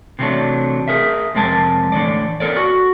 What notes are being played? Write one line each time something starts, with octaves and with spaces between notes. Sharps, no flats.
C3 E3 F#3 A3 D4
G#4 A#4 E5
F2 C3 G#3 A#4 A5
A2 D3 E3 D5
B3 A4 A#4 D5
F#4